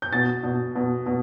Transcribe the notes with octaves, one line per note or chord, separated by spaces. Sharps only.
G6
B2 A6
B2
B2
B2